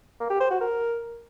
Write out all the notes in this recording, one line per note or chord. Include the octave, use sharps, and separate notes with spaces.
A#3
G4
C5
F#4
A#4